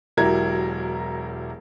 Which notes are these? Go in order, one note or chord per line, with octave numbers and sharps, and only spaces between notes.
E1 F#3 E4 G4 A#4 G#6